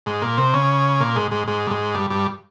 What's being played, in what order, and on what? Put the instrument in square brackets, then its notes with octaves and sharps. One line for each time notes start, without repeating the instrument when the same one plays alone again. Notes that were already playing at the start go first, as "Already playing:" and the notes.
[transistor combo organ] G#2
A#2
C3
C#3
A#2
G#2
G#2
G#2
G2
G#2
G2
G2